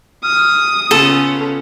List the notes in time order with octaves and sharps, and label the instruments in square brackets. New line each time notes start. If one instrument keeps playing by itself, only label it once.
[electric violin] D#6 [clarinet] F6
[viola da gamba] C#3 B3 C#4 [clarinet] F4 [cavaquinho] A4